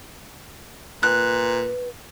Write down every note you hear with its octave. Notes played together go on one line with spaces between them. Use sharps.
A#2 B4 F#6